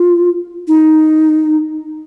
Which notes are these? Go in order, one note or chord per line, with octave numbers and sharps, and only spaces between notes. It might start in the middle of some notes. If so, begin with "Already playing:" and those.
Already playing: F4
D#4